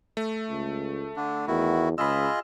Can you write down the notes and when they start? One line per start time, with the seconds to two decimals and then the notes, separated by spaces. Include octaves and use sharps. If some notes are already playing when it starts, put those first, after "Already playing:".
0.17 A3
0.49 C#2
1.16 D3 D4
1.47 E2 D#3 E4 F#4
1.98 C#2 F4 G#4 D#5 B5 E6